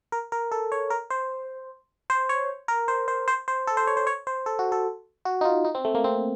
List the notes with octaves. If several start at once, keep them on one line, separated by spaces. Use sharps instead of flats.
A#4
A#4
A4
C#5
A#4
C5
C5
C#5
A#4
C5
C5
C5
C5
A4
C5
C#5
C5
C#5
C5
A4
F#4
A4
F#4
D#4
F4
D#4
C4
A3
A#3
C4